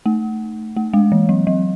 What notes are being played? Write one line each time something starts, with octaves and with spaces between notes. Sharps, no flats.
A3
A3
G#3
E3
F#3
F#3